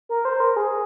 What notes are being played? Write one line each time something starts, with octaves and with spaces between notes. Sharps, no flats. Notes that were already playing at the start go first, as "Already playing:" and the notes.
A#4
C5
A#4
G#4